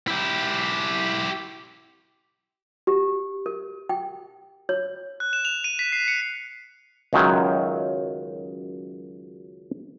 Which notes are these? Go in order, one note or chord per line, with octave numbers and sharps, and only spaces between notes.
E4 G4
G4
A#4
G5
C#5
F#6
E7
F7
D#7
B6
C7
C#7
C#2 F#2 D#3 F#3